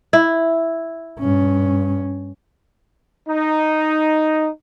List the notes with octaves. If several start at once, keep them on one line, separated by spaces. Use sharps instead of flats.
E4
G2 C#4
D#4